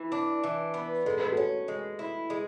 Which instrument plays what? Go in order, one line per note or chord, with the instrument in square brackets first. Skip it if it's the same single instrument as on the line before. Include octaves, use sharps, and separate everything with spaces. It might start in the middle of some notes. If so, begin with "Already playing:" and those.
Already playing: [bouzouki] E3
D4
E3
B3
[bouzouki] G#3 [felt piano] A4
[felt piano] B4
F#4 A4
[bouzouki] C#4
G#3
E4
G#3